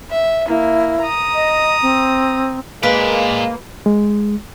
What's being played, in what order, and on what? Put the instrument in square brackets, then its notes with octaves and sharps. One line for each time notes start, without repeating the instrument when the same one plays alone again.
[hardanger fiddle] E5
[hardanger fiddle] A#3 [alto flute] E4
[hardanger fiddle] A#5 D#6
[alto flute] D#5
C4
[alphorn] G#3 [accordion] A#3 [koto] B4 [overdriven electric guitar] D5 F5
[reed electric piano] G#3